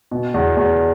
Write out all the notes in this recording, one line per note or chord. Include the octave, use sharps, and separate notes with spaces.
B2
E2
E2